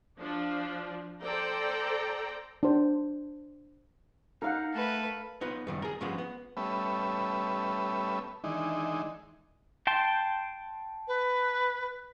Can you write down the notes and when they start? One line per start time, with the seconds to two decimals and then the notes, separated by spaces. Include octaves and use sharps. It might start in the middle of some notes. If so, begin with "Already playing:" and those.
0.20 F3 D4
1.23 A4 C5 D5 G5 A#5
2.63 D4 C5
4.42 D#4 A#4 F5 F#5
4.74 A3 A4 B4
5.41 B3 D#4 F4 B4
5.67 F#2 D#3 G3
5.82 G#4 A#4
6.00 G2 C#3 F3 G#3 B3
6.18 B3
6.57 G3 A3 B3 C#4 B4 E5
8.44 D#3 E3 G#3 D4 D#4
9.87 G5 A5 C6
11.08 B4